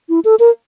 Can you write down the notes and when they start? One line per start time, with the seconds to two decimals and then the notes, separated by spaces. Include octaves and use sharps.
0.09 E4
0.25 A4
0.39 A#4